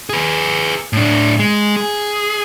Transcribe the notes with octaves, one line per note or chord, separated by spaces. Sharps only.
G#4 B4
A2 D4
G#3
G#4